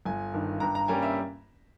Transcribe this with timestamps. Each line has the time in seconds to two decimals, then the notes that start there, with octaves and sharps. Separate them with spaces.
0.05 G1 G#5
0.34 G2 D#3
0.60 G2 A#5
0.75 A#5
0.88 G3 A#3 C#4 G#5
1.02 E5